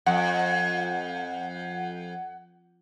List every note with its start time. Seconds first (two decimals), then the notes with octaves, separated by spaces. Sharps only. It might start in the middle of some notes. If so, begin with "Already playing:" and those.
0.06 F2 F#5